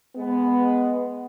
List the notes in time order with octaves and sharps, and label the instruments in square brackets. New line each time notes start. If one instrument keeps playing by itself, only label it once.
[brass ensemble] G#3 B3